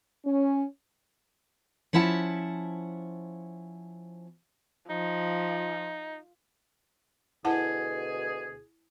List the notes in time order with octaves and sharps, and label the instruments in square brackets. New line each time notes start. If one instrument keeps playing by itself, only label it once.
[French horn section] C#4
[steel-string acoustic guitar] F3 C#4 E4 F#5 A5
[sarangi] F3 [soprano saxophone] D#4
[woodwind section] D2 B2 G#4 [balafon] E4 F#5 A5